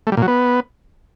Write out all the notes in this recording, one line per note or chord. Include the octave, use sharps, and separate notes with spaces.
A3
G3
A#2
F#3
B3